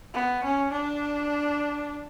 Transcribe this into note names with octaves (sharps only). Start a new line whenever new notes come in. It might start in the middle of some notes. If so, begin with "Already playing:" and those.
B3
C#4
D4